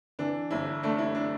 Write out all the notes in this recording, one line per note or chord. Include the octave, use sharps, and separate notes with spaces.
E3 D4
G1 E4
A3 D4
E4
D4